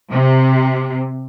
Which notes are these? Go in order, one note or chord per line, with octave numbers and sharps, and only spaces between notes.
C3